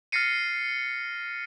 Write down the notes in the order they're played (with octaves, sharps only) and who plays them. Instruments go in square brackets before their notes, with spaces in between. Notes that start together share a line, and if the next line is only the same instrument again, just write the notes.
[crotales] F6 A6 A#6 C7 C#7 D#7